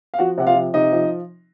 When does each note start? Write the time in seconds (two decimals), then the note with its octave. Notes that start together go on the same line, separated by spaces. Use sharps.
0.14 F5
0.18 F3 F#4 F#5
0.38 C3 F#5
0.47 F4 F5
0.55 F3
0.74 C3 D#4 D#5
0.92 F3